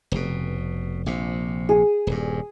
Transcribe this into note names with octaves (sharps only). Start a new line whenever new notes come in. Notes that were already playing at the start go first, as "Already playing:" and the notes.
F1 B2
A#1 C3
G#4
D#1 G2